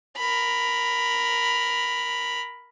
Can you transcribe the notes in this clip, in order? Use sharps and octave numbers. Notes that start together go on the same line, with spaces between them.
A#4 B5